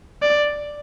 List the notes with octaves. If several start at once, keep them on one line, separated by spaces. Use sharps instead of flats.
D5